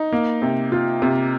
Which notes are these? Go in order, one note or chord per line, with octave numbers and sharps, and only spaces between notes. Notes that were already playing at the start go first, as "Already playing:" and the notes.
Already playing: D#4
A#3
C3
F4
C3